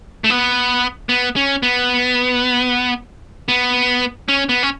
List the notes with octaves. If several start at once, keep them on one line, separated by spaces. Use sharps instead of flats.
A3
B3
B3
C#4
B3
B3
C#4
B3
C#4